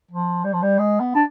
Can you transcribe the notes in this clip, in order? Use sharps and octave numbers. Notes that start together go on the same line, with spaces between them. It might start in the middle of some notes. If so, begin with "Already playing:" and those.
F3
G3
F3
G3
G#3
B3
D4